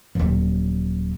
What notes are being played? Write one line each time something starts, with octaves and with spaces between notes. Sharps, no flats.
D#1 F#3